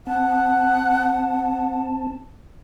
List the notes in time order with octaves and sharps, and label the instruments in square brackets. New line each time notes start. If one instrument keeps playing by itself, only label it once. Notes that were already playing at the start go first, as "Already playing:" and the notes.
[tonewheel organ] C4 A5 [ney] F#5